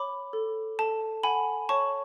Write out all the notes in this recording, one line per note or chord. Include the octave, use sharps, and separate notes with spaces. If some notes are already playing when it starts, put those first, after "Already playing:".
Already playing: C#5 B5 D6
A4
A4 A5
F#5 G#5 B5
C#5 A5 C#6